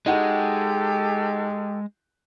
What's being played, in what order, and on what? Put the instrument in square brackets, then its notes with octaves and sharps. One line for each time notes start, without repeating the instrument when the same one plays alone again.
[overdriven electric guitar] G#3 [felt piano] D#4 F#4 G5 [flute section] G4 A4